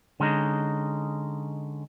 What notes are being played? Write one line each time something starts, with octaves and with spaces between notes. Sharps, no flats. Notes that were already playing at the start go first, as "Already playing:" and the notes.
D3 G#3 C#4 D#4